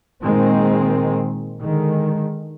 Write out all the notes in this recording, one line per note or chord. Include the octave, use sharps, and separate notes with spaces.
A#2 D#3 G#3 C4
D3 D#3 G#3